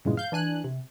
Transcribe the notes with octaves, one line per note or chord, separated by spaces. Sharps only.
G2 A#2 C#3 E3 G#3
F5 G6
E3 D4 G#5 F#6
C3